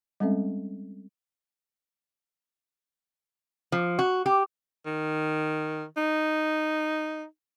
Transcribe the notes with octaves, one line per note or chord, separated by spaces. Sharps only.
G3 G#3 C4 C#4 A4 E5
F3
F#4
G4
D#3
D#4